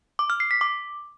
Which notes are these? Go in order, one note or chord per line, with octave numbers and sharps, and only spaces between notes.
D6
F6
C7
B6
D6